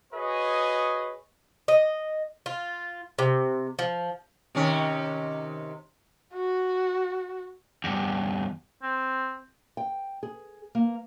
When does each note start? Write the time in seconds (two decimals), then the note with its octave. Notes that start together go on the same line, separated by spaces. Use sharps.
0.13 F#4 G#4 B4 C#5 D#5
1.68 D#5
2.46 F4
3.19 C3
3.79 F3
4.55 C3 D#3 C#4
6.33 F#4
7.84 E2 G2
8.83 C4
9.77 G5
10.23 G#4
10.75 A#3